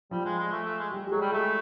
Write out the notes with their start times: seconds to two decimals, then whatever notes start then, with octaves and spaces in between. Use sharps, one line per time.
0.11 F3 G3 F4
0.25 G#3
0.38 G#3
0.52 A3
0.64 A3
0.79 G#3
0.92 G3 G4
1.07 G4
1.12 F#3 G#3 G#4
1.21 G3
1.32 G#3 A3 G#4